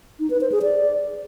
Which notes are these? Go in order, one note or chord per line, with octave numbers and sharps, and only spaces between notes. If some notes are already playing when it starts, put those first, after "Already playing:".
D#4
B4
C5
G#4
D5